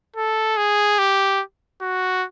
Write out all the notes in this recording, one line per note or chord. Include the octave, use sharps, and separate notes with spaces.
A4
G#4
G4
F#4